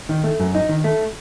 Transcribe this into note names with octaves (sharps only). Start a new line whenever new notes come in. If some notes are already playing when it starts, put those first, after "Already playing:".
D#3
A3
F#2
D#4
D#3
A3